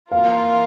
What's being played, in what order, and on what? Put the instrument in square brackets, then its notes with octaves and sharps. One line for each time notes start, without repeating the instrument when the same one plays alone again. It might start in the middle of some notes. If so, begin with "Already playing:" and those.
[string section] E3 A#3 F4 A#4 [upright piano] F5